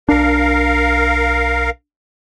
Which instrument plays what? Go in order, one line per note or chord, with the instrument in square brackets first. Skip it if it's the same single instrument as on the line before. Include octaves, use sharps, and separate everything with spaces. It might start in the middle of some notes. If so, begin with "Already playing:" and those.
[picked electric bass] B1 D4 [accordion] A#4 F5